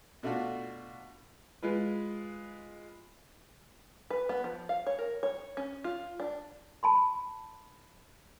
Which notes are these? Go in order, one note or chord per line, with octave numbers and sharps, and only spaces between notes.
B2 A3 D4 F4 F#4
G#3 F4 B4
B4
B3
F3
F5
C#5
A#4
C#5
C#4
F4
D4
A5 B5 C6